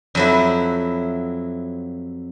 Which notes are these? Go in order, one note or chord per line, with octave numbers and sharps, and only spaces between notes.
F2 F#3 E4